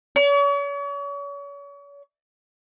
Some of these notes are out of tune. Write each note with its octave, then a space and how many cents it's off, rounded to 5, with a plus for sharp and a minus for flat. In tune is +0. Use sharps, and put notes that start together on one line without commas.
C#5 +40